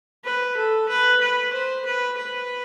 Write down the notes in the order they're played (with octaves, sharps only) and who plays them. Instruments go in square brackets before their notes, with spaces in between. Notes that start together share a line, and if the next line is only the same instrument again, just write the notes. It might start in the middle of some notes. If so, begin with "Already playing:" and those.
[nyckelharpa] B4
A4
B4
B4
C5
B4
B4